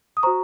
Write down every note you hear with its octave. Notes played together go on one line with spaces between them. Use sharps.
D#6
F#4 C5 A#5 C#6